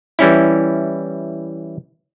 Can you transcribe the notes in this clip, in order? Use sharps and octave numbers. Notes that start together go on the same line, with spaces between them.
E3 G3 C#4 E4